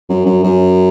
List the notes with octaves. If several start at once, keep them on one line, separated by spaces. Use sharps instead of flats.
F#2
F#2
F#2